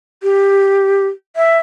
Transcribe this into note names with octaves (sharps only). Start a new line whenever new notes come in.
G4
E5